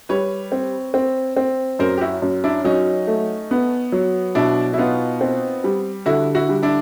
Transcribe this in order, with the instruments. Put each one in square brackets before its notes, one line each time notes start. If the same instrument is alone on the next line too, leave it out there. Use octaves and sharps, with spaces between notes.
[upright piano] G3 [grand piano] B4 C#5
[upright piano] C4
C4
C4
[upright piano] F#2 [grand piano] A#4 C5
[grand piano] G4
E4 F#4
[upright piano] F#2
[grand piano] D4 E4
[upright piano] F#3 [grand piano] C#4 D#4
[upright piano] A3
B3
F#3
[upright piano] B2 [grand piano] D4 E4
[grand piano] E4
[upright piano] B3 [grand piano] D#4 F4
[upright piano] C4
G3
[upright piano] D3 [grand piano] E4 F#4
[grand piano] E4 F#4
[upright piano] G3
[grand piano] D4 E4